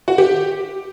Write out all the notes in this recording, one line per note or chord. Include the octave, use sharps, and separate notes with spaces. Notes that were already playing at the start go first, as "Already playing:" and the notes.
F#4
G4